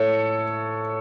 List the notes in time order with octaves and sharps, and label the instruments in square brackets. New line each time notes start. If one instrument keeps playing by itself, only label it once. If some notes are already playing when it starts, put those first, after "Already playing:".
Already playing: [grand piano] A2 A4 C#5